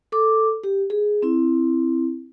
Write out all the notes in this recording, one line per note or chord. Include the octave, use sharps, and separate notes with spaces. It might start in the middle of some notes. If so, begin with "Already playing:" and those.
A4 D6
G4
G#4
C4 E4